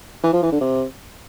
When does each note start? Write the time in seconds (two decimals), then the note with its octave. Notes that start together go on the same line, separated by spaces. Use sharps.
0.23 E3
0.33 F3
0.42 E3
0.52 D3
0.61 C3